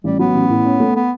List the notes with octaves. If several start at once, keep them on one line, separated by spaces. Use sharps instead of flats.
A1 G3
F#3 B3
A1
A2
C#4
A3
B3